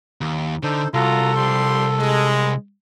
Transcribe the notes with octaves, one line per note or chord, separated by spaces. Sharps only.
D#2
D3 D#4 A4 C5
C2 F4 F#4 A4 A#5
F3 G3 C6
G#3